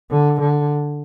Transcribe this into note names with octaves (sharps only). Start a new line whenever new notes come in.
D3
D3